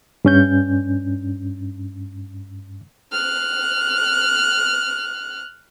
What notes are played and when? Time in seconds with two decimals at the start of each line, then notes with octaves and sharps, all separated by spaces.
0.25 G2 C#4 G6
3.12 F6 F#6